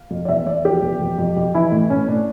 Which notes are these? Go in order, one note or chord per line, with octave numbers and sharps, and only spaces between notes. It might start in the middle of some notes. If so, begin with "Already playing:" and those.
Already playing: F5
F2
D5
E2 E5
E2 D5
F3 G4
E2
F2
F2
F2
E3 E4
A2
A2 C#4
A2 D4